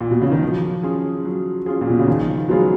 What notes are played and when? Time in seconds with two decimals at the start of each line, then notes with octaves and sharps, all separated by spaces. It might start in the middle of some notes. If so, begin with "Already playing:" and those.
0.01 A#2
0.11 B2
0.22 C#3
0.31 D#3
0.41 F3 F#3
0.83 C#4 F4 G#4
1.25 F#3
1.66 C#4 F4 G#4
1.81 A#2
1.90 B2
1.99 C#3
2.07 D#3 F3
2.49 F#3 G#3 B3 F4 G#4